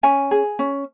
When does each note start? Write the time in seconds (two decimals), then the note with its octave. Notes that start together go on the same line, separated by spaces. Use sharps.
0.03 C#4 G#5
0.31 G#4
0.59 C#4